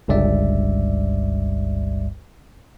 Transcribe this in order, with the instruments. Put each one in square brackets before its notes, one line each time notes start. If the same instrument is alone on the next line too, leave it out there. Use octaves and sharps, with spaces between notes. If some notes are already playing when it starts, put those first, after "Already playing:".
[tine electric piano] G1 C#2 G2 G3 D5 E5